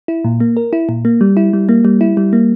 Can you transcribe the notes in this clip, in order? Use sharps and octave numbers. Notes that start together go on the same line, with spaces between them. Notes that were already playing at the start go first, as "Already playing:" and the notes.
E4
A#2
A#3
A#4
E4
A#2
A#3
G3
E4
G3
A#3
G3
E4
G3
A#3